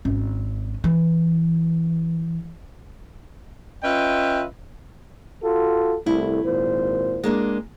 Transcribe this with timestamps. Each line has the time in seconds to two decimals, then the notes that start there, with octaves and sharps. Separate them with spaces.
0.05 G#1 C#4
0.84 E3
3.84 C#4 F4 B4 D#5 E5 G5
5.43 F4 F#4 A4
6.06 C2 A3 E4
6.44 G#1 A#2 C5
7.24 G#3 A#3 D4